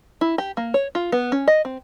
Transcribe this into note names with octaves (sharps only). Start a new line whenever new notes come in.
E4
G4
A#3
C#5
F4
B3
C#4
D#5
C4